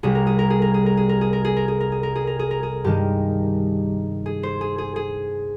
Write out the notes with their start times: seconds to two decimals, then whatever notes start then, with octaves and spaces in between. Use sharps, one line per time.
0.03 C2 C3 G3 G#4
0.15 A#4
0.27 G#4
0.39 A#4
0.50 G#4
0.62 A#4
0.74 G#4
0.86 A#4
0.97 G#4
1.09 A#4
1.21 G#4
1.33 A#4
1.45 G#4
1.56 A#4
1.68 G#4
1.80 A#4
1.92 G#4
2.03 A#4
2.16 G#4
2.27 A#4
2.39 G#4
2.51 A#4
2.63 G#4
2.84 G2 D#3 G#3 G4
4.26 G#4
4.43 C5
4.61 G#4
4.78 G#4
4.96 G#4